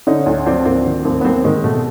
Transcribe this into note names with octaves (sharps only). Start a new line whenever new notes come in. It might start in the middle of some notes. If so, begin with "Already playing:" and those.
D3 C#4 D#4
D2
F3 C4 D4
D2 A#3 C4
D#3
D#2 A#3 C4
B3
D#2 A#3 C4
D#3 G#3
B2 A3